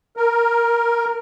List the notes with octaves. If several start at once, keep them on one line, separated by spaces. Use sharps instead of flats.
A#4